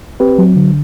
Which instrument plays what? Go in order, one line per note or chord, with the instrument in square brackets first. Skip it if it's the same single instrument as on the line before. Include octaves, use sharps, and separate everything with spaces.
[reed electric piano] C4 G4 B4
F#3
D3